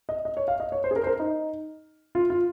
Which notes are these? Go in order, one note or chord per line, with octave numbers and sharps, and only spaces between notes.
D#5
D#5
C#5
F5
D#5
C#5
C5
G#4
A#4
C5
A#4
D#4
F4
F4